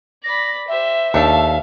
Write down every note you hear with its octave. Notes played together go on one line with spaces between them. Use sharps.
D5 B5 A#6
G4 C5 E5
D#2 A3 D4 A4 F5